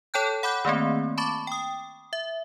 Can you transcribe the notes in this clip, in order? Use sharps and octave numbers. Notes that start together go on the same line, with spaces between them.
A4 C#5 G5 A5 F#6 G6
F#5 B5 D6 F#6 G6
D#3 A3 A#3 C4
A5 B5 C#6 D6 A6
G5 D#6
E5